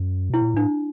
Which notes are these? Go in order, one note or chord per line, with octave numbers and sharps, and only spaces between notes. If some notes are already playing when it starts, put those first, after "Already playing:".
Already playing: F#2
B2 E4
A#2
A2 D4